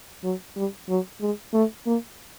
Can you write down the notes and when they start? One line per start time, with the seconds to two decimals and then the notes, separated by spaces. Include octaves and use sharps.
0.24 F#3
0.57 G3
0.89 F#3
1.21 G#3
1.54 A3
1.86 A#3